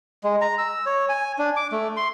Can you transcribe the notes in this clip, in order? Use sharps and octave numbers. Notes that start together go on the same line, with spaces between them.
G#3
A#5
E6
C#5
G#5
D4
D6
A3
C6